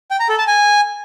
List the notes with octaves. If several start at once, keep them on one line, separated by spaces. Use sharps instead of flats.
G5
A#5
A4
A5
G#5